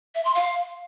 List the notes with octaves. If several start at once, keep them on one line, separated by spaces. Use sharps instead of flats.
E5
C6
F5